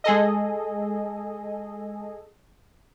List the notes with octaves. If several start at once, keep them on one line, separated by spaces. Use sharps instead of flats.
G#3 G#4 A4 D#5